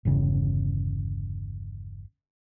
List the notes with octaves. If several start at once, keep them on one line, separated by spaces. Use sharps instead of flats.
G1 E2 C#3